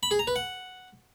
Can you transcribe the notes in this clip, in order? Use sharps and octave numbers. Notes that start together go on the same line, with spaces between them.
B5
G#4
A#5
B4
F#5